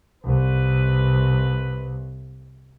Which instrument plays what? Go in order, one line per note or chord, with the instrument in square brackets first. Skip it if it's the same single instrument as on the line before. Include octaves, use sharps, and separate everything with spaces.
[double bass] C2 [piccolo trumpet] B4